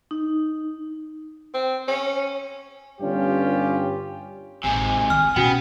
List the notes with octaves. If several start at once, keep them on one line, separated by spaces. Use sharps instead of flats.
D#4
C4
C#4
G1 G2 C#4 F4 G4
A1 G#2 C3 G#5
D#3 F6
B2 B3 C#4 F#4 G5